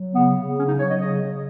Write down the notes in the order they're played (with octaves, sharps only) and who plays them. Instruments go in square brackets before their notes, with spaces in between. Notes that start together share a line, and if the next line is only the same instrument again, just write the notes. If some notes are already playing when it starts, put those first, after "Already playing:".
Already playing: [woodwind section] F#3
C#3 B3
C#3
F#3 C#4
D#4
F#3 C#5
D#5
C#3 D#5
C#3